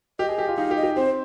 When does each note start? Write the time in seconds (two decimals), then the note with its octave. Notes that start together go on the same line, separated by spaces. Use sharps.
0.19 G4 D#5
0.29 G#4
0.38 G4
0.48 F4
0.57 D#4 F5
0.71 G4
0.77 D#5
0.83 G4
0.96 C4 C5